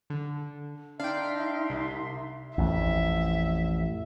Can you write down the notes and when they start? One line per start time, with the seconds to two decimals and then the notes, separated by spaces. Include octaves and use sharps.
0.10 D3
1.00 D4 D#4 E5 F5 G5 C6
1.70 C2
2.58 A1 F2 E5